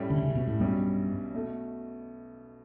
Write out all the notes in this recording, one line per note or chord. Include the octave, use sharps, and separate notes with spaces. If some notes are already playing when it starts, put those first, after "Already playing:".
Already playing: A2 G3 C#4 E4
D3
C#3
B2
A2
B1 G2 B2 G3 C#4
B2 A3